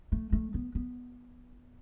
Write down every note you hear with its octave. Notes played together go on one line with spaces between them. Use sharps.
A3
A3
B3
B3